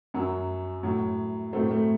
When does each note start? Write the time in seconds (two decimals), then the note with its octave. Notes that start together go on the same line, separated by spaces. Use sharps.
0.14 F#2 F#3
0.83 A2 F#3
1.53 F#3 A3 C4
1.56 A2
1.71 A3